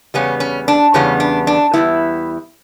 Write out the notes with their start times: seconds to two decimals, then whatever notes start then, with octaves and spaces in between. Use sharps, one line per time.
0.14 E2 C#3 G3 B3 C#4
0.40 C#4
0.68 D4
0.94 E2 C#3 G3 B3 C#4
1.20 D4
1.47 D4
1.74 E2 C#3 G3 B3 E4